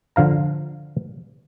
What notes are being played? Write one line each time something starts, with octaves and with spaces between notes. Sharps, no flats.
D3 F3 F5 A#5